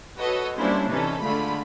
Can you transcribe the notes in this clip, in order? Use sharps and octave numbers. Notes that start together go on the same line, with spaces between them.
F#4 A4 B4 C#5 D#5
G3 A#3 C#4 D4 E4 C5
C3 E3 C#4 D#4 A4
D3 G#3 A3 F4 B5